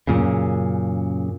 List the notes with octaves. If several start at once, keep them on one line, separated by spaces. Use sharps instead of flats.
F#2 A#2 C#3